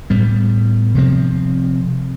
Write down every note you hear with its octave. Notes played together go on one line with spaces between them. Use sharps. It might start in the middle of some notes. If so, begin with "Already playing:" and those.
A2 G3 B3
C3 F3 C4